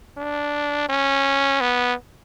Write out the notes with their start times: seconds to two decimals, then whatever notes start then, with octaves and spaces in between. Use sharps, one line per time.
0.17 D4
0.89 C#4
1.61 B3